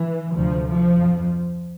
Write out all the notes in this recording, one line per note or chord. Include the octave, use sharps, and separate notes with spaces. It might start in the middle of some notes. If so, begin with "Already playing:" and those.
Already playing: E3
D2 C3 F3
F3
F2